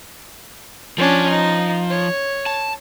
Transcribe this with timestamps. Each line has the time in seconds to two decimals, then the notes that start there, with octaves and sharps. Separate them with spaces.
0.98 F3 C#4 D4
1.30 D#4
1.90 C#5
2.46 A5